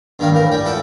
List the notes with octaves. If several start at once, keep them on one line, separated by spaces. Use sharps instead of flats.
G2 D#3 G3 A#3 F5
A2 E3 A#4
G3 G#4 G5
F4 A4 E5 F#5 G5 A5